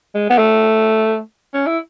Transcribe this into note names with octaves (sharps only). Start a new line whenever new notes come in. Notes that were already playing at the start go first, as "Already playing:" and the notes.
G#3
B3
A3
C#4
E4